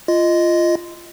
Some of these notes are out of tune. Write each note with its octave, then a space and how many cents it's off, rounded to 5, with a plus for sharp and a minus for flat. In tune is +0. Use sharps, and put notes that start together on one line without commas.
F4 -15 D#5 +0